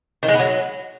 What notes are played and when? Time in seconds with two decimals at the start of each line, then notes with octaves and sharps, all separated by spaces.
0.23 D#3
0.28 G#3
0.34 B3
0.39 F#3